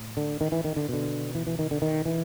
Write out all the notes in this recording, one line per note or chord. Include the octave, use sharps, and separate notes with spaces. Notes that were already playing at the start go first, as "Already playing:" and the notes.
Already playing: A2
D3
D#3
E3
D#3
D3
B2 D3
E3
E3
D#3
D3
D#3
E3